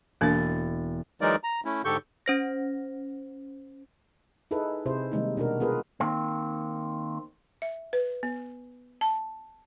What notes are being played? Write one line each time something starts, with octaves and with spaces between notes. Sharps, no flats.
E1 A#3 D4 A6
E3 F#3 G#3 D#4 A#4 D5
A#5
A3 C#4 E4
G#2 D3 G4 A4 C#6 G6
C#4 C5 A#6
D#4 E4 G#4 A4 B4
C3 E4 G#4 C5
C3 D#3 G3 G#3 A#3 D#4
B2 D4 F#4 A#4
B3 F4 G#4 A#4 B4
D#3 A#3 C4
E5
B4
B3
A5